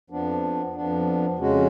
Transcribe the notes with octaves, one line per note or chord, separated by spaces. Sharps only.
F2 F3 B3 D4
F2 F3 B3 D4
F2 C#3 G#3 C#4 F#4